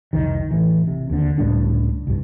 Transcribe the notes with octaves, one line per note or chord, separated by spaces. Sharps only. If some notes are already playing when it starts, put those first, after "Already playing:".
F1 C2 D#3
A1 E3
C3
D#2 D3
C#2 A2 G3 D4
C2 G2